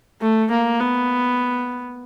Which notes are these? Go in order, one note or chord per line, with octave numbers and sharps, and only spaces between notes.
A3
A#3
B3